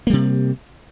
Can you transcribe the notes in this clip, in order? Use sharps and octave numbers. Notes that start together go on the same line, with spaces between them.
C3 G3 A#3